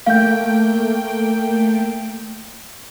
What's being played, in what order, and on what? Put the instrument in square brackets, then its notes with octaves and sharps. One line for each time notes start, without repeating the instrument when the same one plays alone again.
[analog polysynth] A3 A#3 G5 [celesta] F5 G6